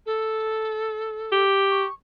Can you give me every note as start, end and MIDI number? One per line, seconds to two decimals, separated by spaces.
0.06 1.43 69
1.32 1.85 67
1.70 1.93 85